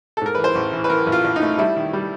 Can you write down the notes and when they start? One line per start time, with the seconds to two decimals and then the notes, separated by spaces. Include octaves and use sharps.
0.17 A4
0.21 G#2 A#4
0.35 E3 B4
0.44 C5
0.55 A1
0.73 E3
0.84 B4
0.89 E3 A#4
1.07 A1
1.12 F4
1.24 A1
1.36 D#4
1.42 A3
1.58 G3 E4
1.76 D#3
1.93 G3